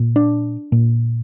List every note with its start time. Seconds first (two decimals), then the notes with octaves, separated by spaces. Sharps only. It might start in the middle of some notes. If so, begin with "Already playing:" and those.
Already playing: A#2
0.16 D4
0.72 A#2